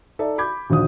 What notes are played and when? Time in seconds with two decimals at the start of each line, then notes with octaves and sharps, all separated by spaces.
0.19 D#4 A4 D5 E5
0.38 B5 D6 G6 G#6
0.70 A#1 D#2 D3 F#4 D#6